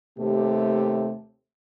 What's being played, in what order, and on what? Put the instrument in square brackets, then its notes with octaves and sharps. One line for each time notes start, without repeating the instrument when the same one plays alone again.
[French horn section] D#2 C3 A3 G4